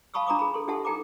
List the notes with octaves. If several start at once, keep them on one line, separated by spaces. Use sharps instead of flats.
F5 A5 B5 C#6 D#6 E6
D4 A#5 B5 D6 D#6
G#4 A#5 B5
G#4 A4 C6
D4 G4 A4 E5 F#5 A5
D#4 A4 G5 A#5 D6